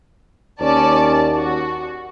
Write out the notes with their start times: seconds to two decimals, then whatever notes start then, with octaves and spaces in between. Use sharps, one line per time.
0.61 D#2 C#4 D5 A5
1.36 F#4